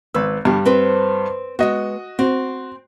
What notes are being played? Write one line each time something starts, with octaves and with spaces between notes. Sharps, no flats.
G#1 B4 E6
G2 D3 G3
C4 B4 C5
G#3 B3 F#4 D#5
C4 F#4